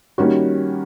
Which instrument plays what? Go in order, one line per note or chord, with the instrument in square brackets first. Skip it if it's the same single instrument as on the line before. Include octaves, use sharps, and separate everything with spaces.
[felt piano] D#3 G3 A#3 C#4 F#4